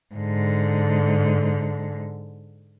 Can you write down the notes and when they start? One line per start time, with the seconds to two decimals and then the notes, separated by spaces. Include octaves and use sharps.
0.15 G#2 D3